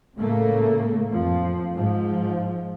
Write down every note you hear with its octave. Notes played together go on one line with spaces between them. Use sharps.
A2 C#3 A3 A#3
F2 F3
G#2 F3